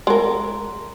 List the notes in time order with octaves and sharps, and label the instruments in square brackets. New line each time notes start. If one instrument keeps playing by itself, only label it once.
[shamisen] G#3 A#4